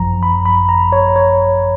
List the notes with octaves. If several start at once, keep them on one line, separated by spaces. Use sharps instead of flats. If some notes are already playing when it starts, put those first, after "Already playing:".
Already playing: G#1 F#2 F3 A#5
B5
B5
A#5
C#5
C#5